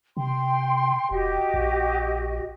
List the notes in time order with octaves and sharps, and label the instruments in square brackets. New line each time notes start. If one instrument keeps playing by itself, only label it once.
[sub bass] C3 [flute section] G5 C6
[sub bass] E1 [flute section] F#4 G4 D#5
[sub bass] A#1